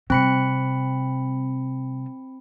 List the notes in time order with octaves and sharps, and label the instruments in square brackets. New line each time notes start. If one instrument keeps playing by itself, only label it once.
[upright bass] C3 G3 [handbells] C4 B5 C#7